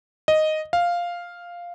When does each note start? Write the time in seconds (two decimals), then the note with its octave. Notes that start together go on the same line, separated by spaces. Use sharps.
0.28 D#5
0.73 F5